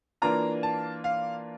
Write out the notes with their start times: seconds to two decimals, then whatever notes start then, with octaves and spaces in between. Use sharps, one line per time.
0.22 E3 A#3 D4 F4 A#5
0.63 A5
1.04 F5